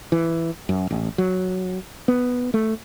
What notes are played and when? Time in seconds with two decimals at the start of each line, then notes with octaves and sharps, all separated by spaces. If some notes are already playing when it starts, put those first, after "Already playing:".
0.12 E3
0.69 F#2
0.91 A1
1.18 F#3
2.08 B3
2.54 A3